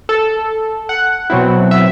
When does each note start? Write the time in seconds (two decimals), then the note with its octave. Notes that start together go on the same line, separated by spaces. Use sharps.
0.09 A4
0.89 F#5
1.30 B2 F#3 C4 E4
1.71 E5